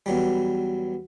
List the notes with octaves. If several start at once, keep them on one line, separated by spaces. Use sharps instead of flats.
E2 F#3 G3